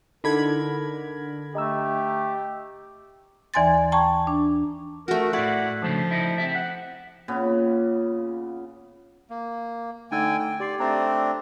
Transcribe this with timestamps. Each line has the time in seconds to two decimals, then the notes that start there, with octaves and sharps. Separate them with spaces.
0.24 D3 D#4 E4 A4 A#4 B5 G#6
1.55 A3 G4 D#5 A#5 E6
3.54 D#2 E3 D5 G#5 C6 A6
3.92 G5 A5 A#5 C#6 G#6
4.27 D4
5.08 A3 F#4 A#4
5.33 A2 E4 D5 F#5
5.82 C#3 F3 A3 D4
6.11 D#4 E4
6.38 C4 G4 E5
6.55 F#5
7.28 A#2 C#3 B3
9.30 A#3
10.12 D3 A3 D#4 G5 G#5 E6
10.39 G5
10.60 G4 D5 C6 C7
10.80 A3 C4 D4 D5 A#5